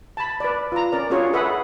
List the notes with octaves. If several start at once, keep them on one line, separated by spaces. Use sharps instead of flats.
A5 B5
B4 D5
F4 A#5
C#4 A#4 D5
C#4 D4 F4 F#4 G#4 C#5
G#4 A4 B4 E5 F#5